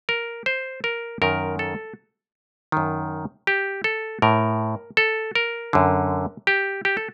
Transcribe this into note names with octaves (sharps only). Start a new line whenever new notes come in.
A#4
C5
A#4
F#2 D#3 A#4
A4
F#2 D#3
G4
A4
A2 A#4
A4
A#4
F#2 D3
G4
G4
A4